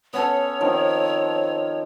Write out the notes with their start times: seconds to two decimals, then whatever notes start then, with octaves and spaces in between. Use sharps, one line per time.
0.13 B3 C#4 A4 C#5
0.61 D#3 F3 C4